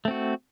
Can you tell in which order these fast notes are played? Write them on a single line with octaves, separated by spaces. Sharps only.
A3 C4 F#4